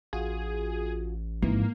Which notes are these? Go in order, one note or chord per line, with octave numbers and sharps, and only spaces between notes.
A1 F4 F#4 G#4
F2 G#2 E3 A#3